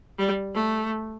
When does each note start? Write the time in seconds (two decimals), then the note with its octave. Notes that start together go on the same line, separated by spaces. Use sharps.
0.19 G3
0.55 A3